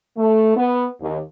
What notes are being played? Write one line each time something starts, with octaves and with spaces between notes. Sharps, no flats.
A3
B3
D#2